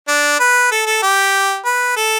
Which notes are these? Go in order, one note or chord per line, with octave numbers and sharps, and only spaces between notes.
D4
B4
A4
A4
G4
B4
A4